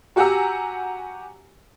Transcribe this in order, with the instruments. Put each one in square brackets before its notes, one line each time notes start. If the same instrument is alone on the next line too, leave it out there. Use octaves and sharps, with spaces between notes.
[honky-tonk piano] F#4 G4 F#5 G#5 A#5 E6